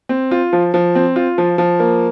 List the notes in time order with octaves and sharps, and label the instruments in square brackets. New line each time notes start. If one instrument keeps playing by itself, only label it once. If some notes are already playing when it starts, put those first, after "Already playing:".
[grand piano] C4
F4
F3
F3
C4
F4
F3
F3
A#3